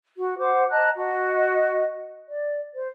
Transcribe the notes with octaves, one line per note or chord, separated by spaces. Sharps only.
F#4
C5 F#5 D6
D#5 A5 A#5 F#6
F#4 D#5
D5
C5